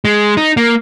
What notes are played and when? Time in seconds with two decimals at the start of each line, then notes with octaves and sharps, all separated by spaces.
0.05 G#3
0.37 D#4
0.57 A#3